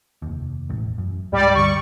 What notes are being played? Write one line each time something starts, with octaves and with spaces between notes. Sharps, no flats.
F1 D#2
E1 A1 A2
F#2
C#2 G#2 G3 G#3 D5
C#2 G2 D3 C#6